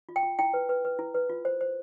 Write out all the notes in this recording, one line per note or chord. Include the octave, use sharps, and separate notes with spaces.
F4
G5
F4
E4 G5
B4
B4
B4
E4
B4
F4
C5
C5